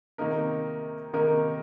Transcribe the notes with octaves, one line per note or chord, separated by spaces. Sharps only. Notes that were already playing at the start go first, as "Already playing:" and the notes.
C3 D#3 A#3 D#4 A#4
C3 D#3 A#3 D#4 A#4